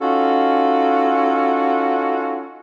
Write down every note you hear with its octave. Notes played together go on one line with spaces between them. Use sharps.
C#4 D#4 F4 F#4 A4